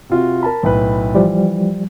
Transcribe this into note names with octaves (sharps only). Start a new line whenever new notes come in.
C3 F4 F#4
A#4 A5 B5
B1 A2 B4
E3 F3 G3